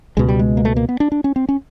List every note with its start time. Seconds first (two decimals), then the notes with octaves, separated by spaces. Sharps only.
0.17 C#2 B2 G#3
0.28 G3
0.39 G#3
0.57 A#3
0.65 A3
0.76 A#3
0.89 B3
1.00 D4
1.12 D4
1.24 C#4
1.36 C4
1.49 C#4